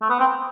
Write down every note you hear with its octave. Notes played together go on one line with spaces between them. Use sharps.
A3
B3
C4